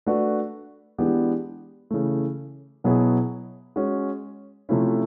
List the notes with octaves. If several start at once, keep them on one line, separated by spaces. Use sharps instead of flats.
A3 D4 F#4 B4 D5
E3 G#3 B3 D4 G4
C#3 E3 A3
B2 F#3 B3 E4 G#4
G#3 C#4 F#4
C3 F3 A3 C#4 E4